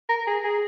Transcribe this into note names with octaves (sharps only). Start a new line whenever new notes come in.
A#4
G#4
G#4